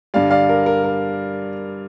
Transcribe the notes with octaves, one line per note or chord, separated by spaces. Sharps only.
G2 D3 G3 D5 F5
D5 F5
A#4
A#4
A#4